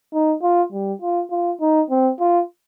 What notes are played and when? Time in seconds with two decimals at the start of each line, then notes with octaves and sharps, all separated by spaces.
0.14 D#4
0.42 F4
0.73 G3
1.02 F4
1.31 F4
1.61 D#4
1.90 C4
2.20 F4